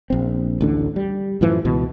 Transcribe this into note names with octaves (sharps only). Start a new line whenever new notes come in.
A#1 C4
A1 D2 D3
G3
F#2 A2 E3 F3
C#2 B2 E3 B3